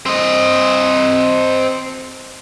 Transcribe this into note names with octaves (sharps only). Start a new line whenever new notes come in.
C4 D#5